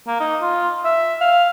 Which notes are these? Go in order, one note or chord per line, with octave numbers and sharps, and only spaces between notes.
A#3
D#4
F4
E5
F5